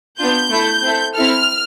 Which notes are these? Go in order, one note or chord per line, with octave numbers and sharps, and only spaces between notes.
B3 D4 F4 G6
A3 E4 A4
C4 E4 A4
C4 E4 A4 F6